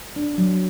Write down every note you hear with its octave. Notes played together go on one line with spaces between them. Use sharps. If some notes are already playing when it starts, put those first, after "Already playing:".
D4
F#3